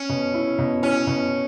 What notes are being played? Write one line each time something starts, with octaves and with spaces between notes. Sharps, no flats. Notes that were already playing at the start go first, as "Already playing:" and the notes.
Already playing: C#4
B2
E4
B2
C#4 E4
B2